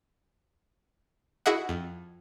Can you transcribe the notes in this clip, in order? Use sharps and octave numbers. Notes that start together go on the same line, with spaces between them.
E4 F#4 G#4 D#5 E5 F#5
F2